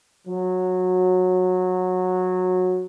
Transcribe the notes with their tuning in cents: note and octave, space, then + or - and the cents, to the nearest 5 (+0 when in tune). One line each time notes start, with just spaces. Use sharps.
F#3 -15